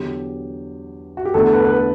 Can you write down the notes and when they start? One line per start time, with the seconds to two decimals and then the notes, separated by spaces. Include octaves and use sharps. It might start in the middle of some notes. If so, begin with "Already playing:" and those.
Already playing: E2 D3 F#3 G4
1.17 F#4
1.25 G4
1.34 E2 D3 A3 A4
1.53 B4
1.65 B4
1.71 A4